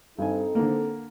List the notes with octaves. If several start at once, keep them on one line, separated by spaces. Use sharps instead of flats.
G2 C4 D#4 A4 G#5
D3 A#3